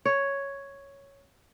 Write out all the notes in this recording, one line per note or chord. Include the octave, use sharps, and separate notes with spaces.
C#5